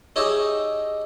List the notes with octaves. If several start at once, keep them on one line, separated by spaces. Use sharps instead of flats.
D#4 G4 G#4 C#5 D#5 E5